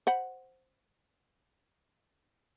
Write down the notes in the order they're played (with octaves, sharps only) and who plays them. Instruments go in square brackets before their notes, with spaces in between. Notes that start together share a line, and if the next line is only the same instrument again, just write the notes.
[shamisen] C5 F#5 B5